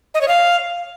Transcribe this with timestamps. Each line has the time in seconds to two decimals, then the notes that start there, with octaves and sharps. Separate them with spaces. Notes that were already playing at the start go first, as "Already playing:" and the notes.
0.14 D#5
0.21 C#5
0.28 F5